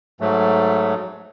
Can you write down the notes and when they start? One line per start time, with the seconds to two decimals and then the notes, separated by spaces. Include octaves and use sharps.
0.21 G#2 F#3 A3